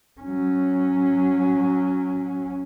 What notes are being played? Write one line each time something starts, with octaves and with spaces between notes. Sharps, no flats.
F#3 C#4